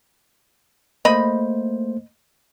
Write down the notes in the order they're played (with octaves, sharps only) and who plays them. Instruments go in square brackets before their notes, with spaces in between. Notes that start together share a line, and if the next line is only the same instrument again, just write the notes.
[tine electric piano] A3 A#3 C5 [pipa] D#5 B5